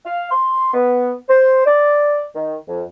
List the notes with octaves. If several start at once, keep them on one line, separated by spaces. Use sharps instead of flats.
F5
C6
B3
C5
D5
D#3
F2